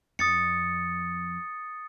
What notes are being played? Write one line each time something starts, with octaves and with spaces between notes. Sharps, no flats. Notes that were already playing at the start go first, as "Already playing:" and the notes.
F2 D#6 A6 C#7